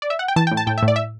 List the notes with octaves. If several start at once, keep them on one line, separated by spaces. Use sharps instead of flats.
D5
E5
F#5
G5
E3 A5
G5
A2
A5
A2 G5
E5
A2
D5
E5